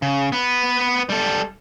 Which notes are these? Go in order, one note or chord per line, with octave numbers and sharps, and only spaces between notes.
C#3
B3 B4
G3 A4